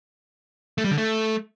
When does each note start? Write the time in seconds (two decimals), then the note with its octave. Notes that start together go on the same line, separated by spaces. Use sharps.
0.78 A3
0.84 G3
0.91 D3
0.98 A3